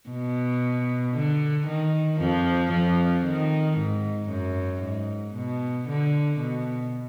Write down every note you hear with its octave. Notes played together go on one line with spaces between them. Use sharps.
B2
D3
D#3
F2 F3
F2 F3
D#3
G#2
F#2
G#2
B2
D3
B2